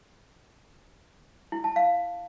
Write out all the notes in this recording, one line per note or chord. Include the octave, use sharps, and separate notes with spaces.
E4
A5
F5